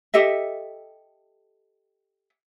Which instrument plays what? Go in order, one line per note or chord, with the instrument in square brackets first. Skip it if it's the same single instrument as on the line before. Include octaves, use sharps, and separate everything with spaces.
[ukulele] G4 A4 D#5 E5